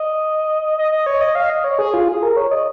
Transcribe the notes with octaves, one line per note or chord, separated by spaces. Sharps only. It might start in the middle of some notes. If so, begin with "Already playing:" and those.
Already playing: D#5
D#5
D#5
C#5
D#5
F5
D#5
C#5
G#4
F4
G#4
A#4
C#5
D#5